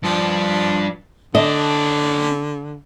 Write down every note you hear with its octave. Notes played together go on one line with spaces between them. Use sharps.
G2 F3 D4
D3 C#4 D#5 A5